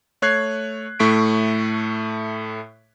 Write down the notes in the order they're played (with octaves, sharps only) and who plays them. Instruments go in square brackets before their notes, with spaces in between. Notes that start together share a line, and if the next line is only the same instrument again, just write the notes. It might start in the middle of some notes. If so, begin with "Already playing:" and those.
[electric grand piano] A3 C#5 F#6 G#6 C7
A2 A3 C#6 B6 D7